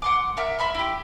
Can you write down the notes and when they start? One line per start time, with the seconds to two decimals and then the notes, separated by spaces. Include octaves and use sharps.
0.02 F#5 C6 D6
0.37 A#4 E5
0.59 E5 B5 C6
0.74 E4 G4